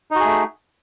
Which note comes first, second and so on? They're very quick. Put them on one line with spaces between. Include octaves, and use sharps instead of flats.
D#4 F#4 G#4 A3